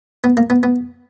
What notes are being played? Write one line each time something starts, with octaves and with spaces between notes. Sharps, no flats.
B3
A#3
B3
B3